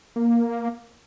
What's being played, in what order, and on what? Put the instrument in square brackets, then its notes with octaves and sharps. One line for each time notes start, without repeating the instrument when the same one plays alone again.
[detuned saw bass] A#3